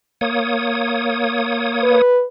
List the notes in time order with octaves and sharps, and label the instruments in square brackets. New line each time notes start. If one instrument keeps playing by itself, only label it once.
[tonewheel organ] A#3 C#5 D#6
[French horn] B4